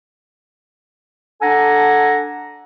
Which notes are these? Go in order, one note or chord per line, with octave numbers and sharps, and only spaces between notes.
D4 A4 F#5 G#5 A#5